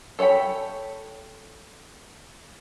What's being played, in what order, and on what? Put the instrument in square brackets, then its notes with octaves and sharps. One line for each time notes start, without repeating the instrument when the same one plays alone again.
[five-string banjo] A4 C#5 F#5 G5 B5